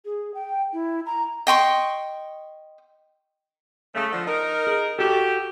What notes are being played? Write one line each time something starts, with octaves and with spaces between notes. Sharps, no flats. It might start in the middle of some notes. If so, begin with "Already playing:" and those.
G#4
G5
E4
A#5
D#5 G5 C6 C#6
C#3 A3
D3 F3
D#4 A#4
G#4
F#4 G4 A4